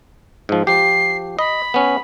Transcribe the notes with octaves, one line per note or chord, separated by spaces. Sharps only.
G#2 F3
F3 G4 C7
D#5 B5
B3 C#4